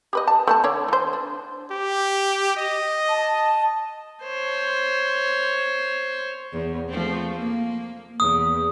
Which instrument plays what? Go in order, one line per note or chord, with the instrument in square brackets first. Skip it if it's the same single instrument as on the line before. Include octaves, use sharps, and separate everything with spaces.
[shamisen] G4 B4 D#5
A5
A3 B3 A5
D3 C#5 D5
E3 C5
D4
[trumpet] G4
D#5
[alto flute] A5
[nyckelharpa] C5 C#5
[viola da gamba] E2
F3 A3 C4
A#3
[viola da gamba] E2 [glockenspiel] D#6